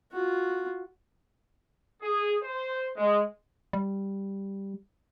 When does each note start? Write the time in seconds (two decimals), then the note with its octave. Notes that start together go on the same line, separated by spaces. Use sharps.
0.13 F4 F#4
2.03 G#4
2.42 C5
2.97 G#3
3.73 G3